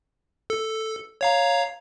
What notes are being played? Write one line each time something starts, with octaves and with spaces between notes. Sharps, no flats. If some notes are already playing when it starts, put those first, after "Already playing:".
A4
C#5 F5 A#5